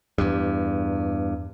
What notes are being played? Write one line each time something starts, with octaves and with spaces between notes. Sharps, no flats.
E2 G2